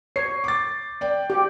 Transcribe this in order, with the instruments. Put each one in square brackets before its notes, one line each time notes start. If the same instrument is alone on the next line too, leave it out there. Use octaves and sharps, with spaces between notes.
[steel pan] C#5 [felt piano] C7
[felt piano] D6 A6
D5 G5
[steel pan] G4